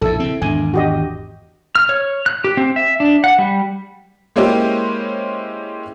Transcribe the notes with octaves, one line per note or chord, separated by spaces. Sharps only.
A#1 F2 E4 A4 E5
C#3 C4
G#1 E2 D4 G#5
F#4 G4 D#5
F6
C#5
F#6
G4
C4
E5
D4
F#5
G3
G#3 A#3 C#4 E4 G4 C5